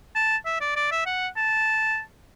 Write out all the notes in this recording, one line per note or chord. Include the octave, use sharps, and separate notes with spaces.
A5
E5
D5
D5
E5
F#5
A5